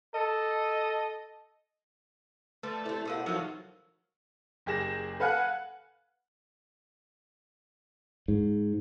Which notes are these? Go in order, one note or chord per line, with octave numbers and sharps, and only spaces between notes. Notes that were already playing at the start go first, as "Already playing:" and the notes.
A4 D#5
D3 F3 A3 B4
C3 D4 E4 A4 C5
B2 D4 G4 A#4 F5 F#5
F3 F#3 C#4 D#4 F#4 A#4 C#6
F#1 G4 G#4 A#6 E7
A4 B4 F5 F#5 G#5 F#6
G#2